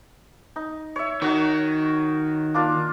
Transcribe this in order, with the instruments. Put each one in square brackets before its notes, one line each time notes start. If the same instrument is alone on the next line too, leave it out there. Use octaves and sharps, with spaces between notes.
[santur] D#4
C#5 E5
[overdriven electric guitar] D#3 [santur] D#4 F#4 C#5
[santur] A#3 D4 F4